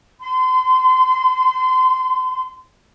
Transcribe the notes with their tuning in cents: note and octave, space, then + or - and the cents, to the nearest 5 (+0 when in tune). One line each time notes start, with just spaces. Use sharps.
C6 -30